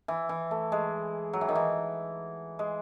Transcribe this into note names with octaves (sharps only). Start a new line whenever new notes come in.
E3
E3
A3
G#3
F#3
E3
D#3
E3
G#3